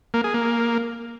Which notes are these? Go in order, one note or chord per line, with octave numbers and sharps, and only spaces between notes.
A#3
G#4
A#3